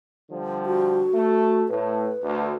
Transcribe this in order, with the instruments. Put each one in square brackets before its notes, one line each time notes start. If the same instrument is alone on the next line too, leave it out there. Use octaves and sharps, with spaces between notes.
[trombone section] D3 F3 G3
[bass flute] F#4
[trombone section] A3
[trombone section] A2 [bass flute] B4
[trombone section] D2